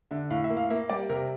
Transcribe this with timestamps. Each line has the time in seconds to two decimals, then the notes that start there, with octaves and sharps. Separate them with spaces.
0.11 D3 E5
0.30 A2 F5
0.44 E5
0.50 A#3
0.57 F5
0.70 A#3 E5
0.89 G3 D5
1.09 C3 A#4